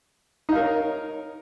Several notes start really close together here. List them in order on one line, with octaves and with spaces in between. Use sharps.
D#4 F5 A#4 C#5